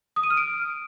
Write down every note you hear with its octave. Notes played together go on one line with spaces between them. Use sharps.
D#6
D#7
F6
D7